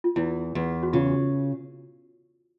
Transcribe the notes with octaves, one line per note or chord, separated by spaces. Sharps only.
F4
E2 E4
E2
F#4
C#3 F4